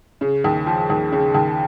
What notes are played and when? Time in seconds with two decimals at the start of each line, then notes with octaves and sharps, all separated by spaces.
0.21 C#3
0.44 D#2
0.66 F3
0.90 D#2
1.12 C#3
1.34 D#2